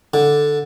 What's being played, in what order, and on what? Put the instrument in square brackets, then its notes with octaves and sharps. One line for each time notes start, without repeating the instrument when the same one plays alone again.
[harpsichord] D3